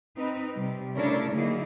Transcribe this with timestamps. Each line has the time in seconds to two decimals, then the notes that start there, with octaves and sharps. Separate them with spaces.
0.17 C4 D#4 B4
0.54 C3 G3
0.95 C#3 A3 D4 E4 A#4 C#5
1.33 D3 F#3 A#3 D#4 E4 G#4